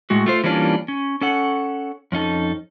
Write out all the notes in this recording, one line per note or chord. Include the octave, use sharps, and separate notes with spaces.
A2 G#3 F#4
A3 F4 C5
E3 G3 A#3 C#4 D4 F4
C#4
C#4 A4 F#5
F2 C#4 D#4 A4